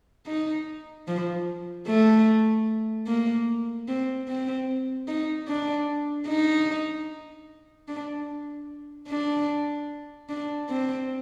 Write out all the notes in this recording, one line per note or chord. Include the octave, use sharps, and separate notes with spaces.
D#4
F3
A3
A#3
C4
C4
D#4
D4
D#4
D4
D4
D4
C4